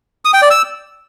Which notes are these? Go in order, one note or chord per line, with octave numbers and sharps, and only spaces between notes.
D#6
G5
D5
E6